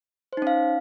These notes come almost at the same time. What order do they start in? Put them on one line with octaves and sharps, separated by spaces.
C5 D#4 C#4 F5